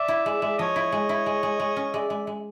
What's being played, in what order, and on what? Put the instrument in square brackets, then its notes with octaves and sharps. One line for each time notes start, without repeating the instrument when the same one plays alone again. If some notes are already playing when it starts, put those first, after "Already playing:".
Already playing: [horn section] D5 E5
[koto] E4
G#3
G#3
[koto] F3 [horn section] C#5 D#5
[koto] E4
G#3
E4
G#3
G#3
G#3
C#4
[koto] G#3 [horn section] D5 E5
[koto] G#3
G#3